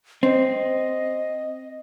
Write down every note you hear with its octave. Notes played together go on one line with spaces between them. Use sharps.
C4 D#5